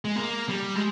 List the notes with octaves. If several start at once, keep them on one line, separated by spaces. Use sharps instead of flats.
G#3
A#3
G3
G#3